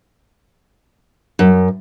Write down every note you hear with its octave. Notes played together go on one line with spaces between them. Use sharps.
F#2